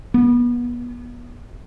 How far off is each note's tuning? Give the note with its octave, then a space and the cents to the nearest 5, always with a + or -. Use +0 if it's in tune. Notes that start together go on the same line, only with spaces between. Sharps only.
B3 -30